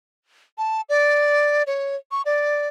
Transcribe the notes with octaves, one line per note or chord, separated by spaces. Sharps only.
A5
D5
C#5
C#6
D5